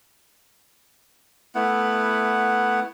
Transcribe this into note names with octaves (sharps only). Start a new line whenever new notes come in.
A3 B3 E4 F#5